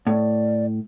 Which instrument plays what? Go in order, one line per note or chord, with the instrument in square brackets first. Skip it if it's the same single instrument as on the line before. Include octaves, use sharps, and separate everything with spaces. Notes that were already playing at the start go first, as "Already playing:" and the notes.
[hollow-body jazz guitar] A2 [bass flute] D5